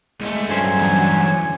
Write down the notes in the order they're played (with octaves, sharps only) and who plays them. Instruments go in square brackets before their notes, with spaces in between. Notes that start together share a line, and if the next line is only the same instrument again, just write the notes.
[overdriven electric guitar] C2 A3 [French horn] G#3
[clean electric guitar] G2 C#4 C5 [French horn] F#3 [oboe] G#5
[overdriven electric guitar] E2 D3